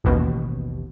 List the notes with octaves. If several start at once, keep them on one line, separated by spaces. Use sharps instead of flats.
A1 D#2 B2